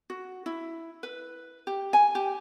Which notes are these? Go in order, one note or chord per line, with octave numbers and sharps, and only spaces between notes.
F#4
E4
B4
G4
G#5
G4